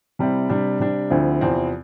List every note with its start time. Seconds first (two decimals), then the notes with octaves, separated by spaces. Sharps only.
0.19 C3 G3 C4 E4
0.50 C3 G3 D4
0.80 C3 G3 D4
1.10 D2 D3 F3 C4 E4
1.40 E2 C3 F3 C4 E4